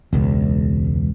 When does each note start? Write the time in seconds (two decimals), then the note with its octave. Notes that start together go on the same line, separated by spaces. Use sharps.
0.13 E1 C#2